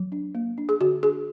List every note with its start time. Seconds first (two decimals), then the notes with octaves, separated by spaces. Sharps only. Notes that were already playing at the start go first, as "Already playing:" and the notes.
Already playing: F#3
0.12 D4
0.35 A#3
0.58 D4
0.69 G#4
0.81 D3 F#4
1.03 D4 G#4